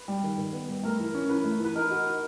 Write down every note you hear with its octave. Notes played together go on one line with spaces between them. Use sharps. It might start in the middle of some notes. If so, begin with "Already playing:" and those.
Already playing: B4
G3
D#3
D#3
B3
G3
A3 A#4
E3
C#4
E3 B4
A3
E3 B4
D#4 A#4
F#4
D#4